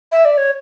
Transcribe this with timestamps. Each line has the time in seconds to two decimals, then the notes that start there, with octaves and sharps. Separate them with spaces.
0.12 E5
0.25 D5
0.37 C#5